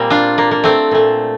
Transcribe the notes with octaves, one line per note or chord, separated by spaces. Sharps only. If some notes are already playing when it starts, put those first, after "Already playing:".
Already playing: A#2 G3 A#3 C4
D4 F4
A#3
A#3
A3 C4
A#2 A3